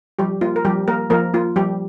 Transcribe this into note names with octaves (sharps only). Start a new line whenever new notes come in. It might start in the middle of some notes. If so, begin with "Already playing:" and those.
F3 G3 G4
A#3 F4
A#4
F3 G3 G4
A#3 A#4
F3 A#3 A#4
A#3 F4
F3 G3 G4